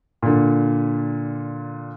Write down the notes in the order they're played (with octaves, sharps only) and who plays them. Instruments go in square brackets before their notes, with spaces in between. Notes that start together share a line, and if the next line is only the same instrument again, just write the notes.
[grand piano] A#2 D3